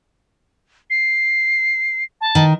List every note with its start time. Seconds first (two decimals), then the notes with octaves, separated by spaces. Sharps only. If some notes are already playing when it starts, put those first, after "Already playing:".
0.90 C7
2.21 A5
2.35 D#3